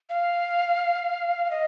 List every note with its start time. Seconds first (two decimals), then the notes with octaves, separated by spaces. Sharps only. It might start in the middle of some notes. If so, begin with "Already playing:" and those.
0.09 F5
1.51 D#5